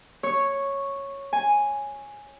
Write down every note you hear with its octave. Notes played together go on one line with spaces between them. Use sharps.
C#5
G#5